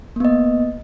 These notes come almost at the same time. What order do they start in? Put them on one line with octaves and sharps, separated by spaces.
A#3 B3 D#5